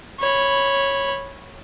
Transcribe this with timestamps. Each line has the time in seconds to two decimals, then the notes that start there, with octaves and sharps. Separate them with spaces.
0.20 C#5 B5